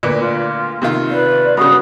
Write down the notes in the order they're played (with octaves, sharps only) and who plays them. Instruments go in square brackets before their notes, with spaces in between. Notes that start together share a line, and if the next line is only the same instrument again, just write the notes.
[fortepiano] D2 A#2 B4
[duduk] F4
[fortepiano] C3 D#3 F4
[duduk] B4 [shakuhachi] D5
[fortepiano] G2 C#3 [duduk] F#4 [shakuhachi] D#6